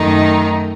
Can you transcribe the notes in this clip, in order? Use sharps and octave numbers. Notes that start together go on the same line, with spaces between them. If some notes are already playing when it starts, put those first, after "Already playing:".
Already playing: F#2 D#3 A3 D#4